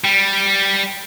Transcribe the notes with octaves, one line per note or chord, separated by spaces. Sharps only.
G3